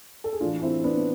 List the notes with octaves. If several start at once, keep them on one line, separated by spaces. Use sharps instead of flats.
A4
G#4
A2 E3 D4 F4
C4 E4
B3 D4